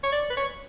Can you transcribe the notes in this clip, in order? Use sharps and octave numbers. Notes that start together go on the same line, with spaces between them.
C#5
D5
B4
C#5